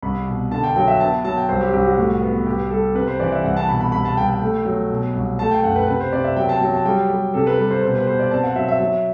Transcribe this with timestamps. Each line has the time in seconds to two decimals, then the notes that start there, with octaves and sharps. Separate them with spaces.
0.02 C2 B5
0.27 B2
0.52 D3 A5
0.64 G5
0.76 F#3 G5
0.88 E5
1.00 B3 A5
1.24 F#3 A5
1.37 G5
1.49 C2 C5
1.61 G4
1.73 C2 G4
1.86 F#4
1.98 A2
2.22 B3
2.47 C2 G4
2.71 G3 A4
2.95 C3 B4
3.08 C5
3.20 E3 D5
3.32 E5
3.44 C2 F#5
3.57 A5
3.69 B2 B5
3.81 B5
3.92 C2 B5
4.05 A5
4.17 C2 G5
4.29 G5
4.42 A3
4.65 F#3
4.90 B2
5.14 C2
5.39 A3 A5
5.51 G5
5.64 F#2 F#5
5.76 B4
5.88 C3 B4
6.00 C5
6.13 C3 D5
6.24 E5
6.36 F#3 G5
6.49 A5
6.61 F#3
6.74 A5
6.85 G3 G5
7.10 G3
7.34 C3 A4
7.47 B4
7.58 G3
7.70 C5
7.83 B2 C5
7.95 B4
8.07 B2 C5
8.20 D5
8.31 C4 A5
8.43 F#5
8.56 F#3 E5
8.68 E5
8.80 F#3